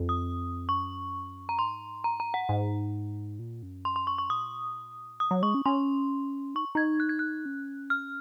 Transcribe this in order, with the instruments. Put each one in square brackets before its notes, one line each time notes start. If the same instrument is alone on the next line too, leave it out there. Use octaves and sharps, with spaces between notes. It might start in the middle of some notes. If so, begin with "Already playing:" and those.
Already playing: [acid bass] F2
[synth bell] D#6
[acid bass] F#2 [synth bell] C#6
[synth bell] A#5
[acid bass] G#2 [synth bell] C6
[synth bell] A#5
A#5
F#5
[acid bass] G#2
A#2
F#2
[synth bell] C6
C6
C#6
C#6
[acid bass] A#2 [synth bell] D#6
[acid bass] C#3 [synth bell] D#6
[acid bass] F#3
[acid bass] G#3 [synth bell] C#6
[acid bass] C#4
[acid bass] C#4 [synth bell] C6
[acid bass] D#4 [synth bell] C#6
[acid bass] D#4 [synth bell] G#6
[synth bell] F#6
G#6
F#6
[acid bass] C#4
[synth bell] F6